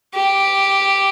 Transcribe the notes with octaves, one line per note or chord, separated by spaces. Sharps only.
G4